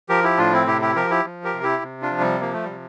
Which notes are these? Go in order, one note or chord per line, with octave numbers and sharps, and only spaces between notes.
F3 G4 A#4
E4 G4
A2 D4 F4
C4 E4
C3 E4 G4
E4 G4
F3 G4 A#4
E4 G4
F3
G4 A#4
C3
E4 G4
C3
D4 F4
F3
G3
F3 A#3
A3
C3 G3